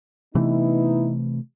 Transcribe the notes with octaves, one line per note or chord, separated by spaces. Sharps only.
C3 E3 A3 B3 D#4 E4